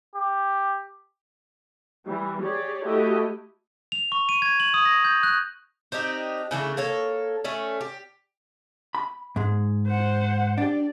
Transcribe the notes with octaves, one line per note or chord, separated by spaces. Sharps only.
G4
E3 G3
G4 G#4 C#5 D5
A3 E4 F#4 G4 A4 D#5
F7
C#6
D#7
G#6
F#7
D#6
A#6
G6
F#6
C4 D4 D#4 G4
C#3 E3 A3 D4
A#3 A4 C#5
A3 C#4 D5
G4
B5
G#2 G#3
C5 F#5
D4 G4 D5